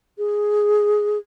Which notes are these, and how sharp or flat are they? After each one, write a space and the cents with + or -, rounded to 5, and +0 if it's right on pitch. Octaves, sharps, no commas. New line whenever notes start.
G#4 +5